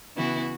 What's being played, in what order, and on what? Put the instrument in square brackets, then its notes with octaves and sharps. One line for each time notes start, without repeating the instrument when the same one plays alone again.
[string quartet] C#3 E3 B3 E4 F#4